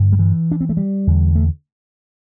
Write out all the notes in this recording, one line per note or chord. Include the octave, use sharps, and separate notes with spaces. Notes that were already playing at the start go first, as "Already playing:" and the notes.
Already playing: G2 D3
G3
E3
D4
C4
A3
G3
E2 D3
A3